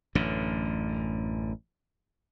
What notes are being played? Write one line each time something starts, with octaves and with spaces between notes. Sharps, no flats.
A1 F#2 D3